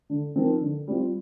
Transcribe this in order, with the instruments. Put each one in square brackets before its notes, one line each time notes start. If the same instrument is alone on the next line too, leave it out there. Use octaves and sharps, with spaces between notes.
[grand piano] D3
F3 C4 D#4 A#4
D3
G3 C4 F4